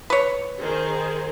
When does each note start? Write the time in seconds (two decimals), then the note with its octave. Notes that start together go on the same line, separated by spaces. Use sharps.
0.10 B4 C#5
0.60 D#3 G#4 C5